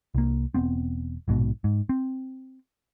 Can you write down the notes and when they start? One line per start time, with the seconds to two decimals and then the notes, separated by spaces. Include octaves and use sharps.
0.15 C2 A#3
0.54 E1 B3 C4
1.28 A#1 G#2 B2
1.64 G#2
1.89 C4